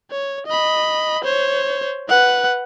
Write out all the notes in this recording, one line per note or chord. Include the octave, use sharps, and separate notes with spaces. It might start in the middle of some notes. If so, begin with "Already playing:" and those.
C#5
D#5 B5
C5 C#5
B4 F#5